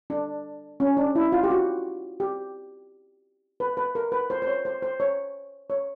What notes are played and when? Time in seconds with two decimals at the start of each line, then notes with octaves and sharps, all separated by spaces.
0.10 D4
0.80 C#4
0.97 D4
1.15 E4
1.32 F4
1.44 G4
1.50 F#4
2.20 G4
3.60 B4
3.77 B4
3.95 A#4
4.12 B4
4.30 C5
4.42 C5
4.47 C#5
4.65 C5
4.82 C5
5.00 C#5
5.70 C#5